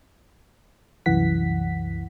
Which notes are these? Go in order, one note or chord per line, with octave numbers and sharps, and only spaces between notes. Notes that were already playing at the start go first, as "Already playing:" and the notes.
C2 F#2 E3 F#5 B6